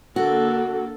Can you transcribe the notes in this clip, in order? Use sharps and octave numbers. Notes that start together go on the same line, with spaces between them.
D3 A#3 F#4 A4